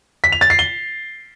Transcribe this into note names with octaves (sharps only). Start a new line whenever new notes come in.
B6
F7
A6
C7
G7